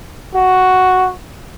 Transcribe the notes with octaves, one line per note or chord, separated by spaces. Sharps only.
F#4